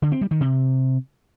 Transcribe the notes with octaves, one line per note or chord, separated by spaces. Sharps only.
D3
C4
G3
D#3
C3